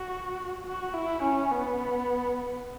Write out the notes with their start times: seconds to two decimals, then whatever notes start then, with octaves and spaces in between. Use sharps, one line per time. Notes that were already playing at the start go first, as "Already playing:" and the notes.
Already playing: F#4
0.65 F#4
0.93 E4
1.23 C#4
1.51 B3